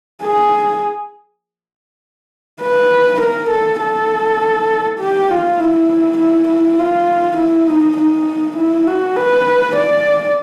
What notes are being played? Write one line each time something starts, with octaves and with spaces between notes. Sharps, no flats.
G#4
B4
A#4
A4
A4
G4
F4
E4
E4
E4
F4
E4
D#4
D#4
E4
F#4
B4
D5